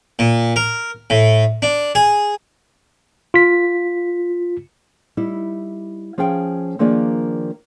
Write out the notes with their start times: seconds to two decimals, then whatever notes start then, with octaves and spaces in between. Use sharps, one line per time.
0.19 A#2
0.56 A#4
1.10 A2
1.62 D4
1.95 G#4
3.34 F4 B6
5.17 G3 D#4 E4
6.18 F3 C#4 G#4 F5 G5
6.79 D#3 F3 A#3 D4 G#4 D5